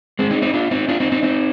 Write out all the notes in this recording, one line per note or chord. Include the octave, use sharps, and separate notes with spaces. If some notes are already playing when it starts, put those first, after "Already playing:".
G#3 C4
C4 D#4
C4 D#4
D4 F4
C4 D#4
D4 F4
C4 D#4
C4 D#4
C4 D#4